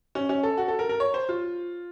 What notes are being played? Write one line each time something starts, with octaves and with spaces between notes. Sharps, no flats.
C#4
C#4
A4
F#4
A4
A#4
A#4
C#5
C5
F4